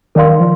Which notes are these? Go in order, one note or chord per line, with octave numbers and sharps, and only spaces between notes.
D#3 A#4 D5 F5 C6
F3